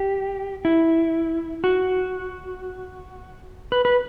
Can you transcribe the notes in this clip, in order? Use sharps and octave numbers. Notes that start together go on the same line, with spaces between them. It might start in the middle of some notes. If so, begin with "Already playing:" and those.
Already playing: G4
E4
F#4
B4
B4